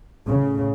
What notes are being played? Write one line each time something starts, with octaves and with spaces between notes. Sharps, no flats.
A2 C#3